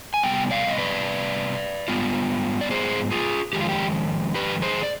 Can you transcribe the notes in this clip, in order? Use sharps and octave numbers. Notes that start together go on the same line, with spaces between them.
G#5
C3 G3 B3 G5
D5 F5
D#5
B4 D5
G#2 G3 B3 F4
D5
G#4 C5
F4 G#4
F2 D#3 G#3 G4
F4
G4
G4 B4
G#4 C5
D5